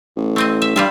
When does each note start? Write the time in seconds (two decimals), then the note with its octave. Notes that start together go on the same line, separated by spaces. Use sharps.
0.17 A1
0.36 A3 C4 D#5
0.62 E5
0.76 G2 G3 F4 E5